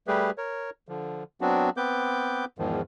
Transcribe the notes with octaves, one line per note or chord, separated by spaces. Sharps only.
G3 A3 G4 G#4 B4
A#4 C#5
D3 F3
F#3 B3 C4 D4 F#4
B3 C4 B4 D6 G6
E2 G#2 D#3 F3